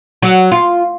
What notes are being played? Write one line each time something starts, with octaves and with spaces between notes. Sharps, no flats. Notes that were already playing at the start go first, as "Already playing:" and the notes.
F#3
F4